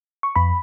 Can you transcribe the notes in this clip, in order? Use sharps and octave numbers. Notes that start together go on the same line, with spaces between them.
C#6
F2 B5